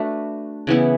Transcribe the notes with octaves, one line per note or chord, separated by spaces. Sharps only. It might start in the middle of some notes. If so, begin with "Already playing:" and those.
Already playing: A3 D4 F#4 B4
C#3 E3 B3 E4